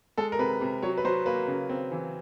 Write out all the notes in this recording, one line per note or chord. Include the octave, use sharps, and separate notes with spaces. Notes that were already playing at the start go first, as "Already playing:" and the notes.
G#3 A4
A#4
C3 B4
C3
F#3 C#5
B4
F#3 C5
A#3 B4
C#3
C4
E3